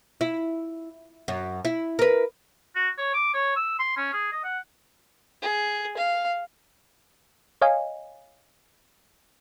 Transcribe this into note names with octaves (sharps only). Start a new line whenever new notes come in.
E4
F#2
E4
A#4 B4
F#4
C#5
D6
C#5
E6
C6
C#4
G#4
D#5
F#5
G#4
F5
C#5 D#5 F5 G#5